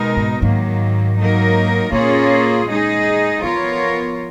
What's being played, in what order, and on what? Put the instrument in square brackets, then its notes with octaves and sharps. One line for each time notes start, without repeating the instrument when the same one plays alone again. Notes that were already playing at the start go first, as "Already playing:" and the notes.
Already playing: [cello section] B2 G#3 D#4 A#4
[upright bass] G#2
[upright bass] G#2 [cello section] D#3 F#3 A#3
[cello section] F#3 A#3 D#4 A#4
[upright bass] A#2 [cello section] A#3 C#4 F4 G#4 C#5
[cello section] G#3 D#4 G#4
[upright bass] F3 [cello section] B3 F4 A#4 C#5